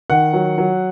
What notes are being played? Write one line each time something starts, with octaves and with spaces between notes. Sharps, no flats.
D#3 F#5
F#3
F#3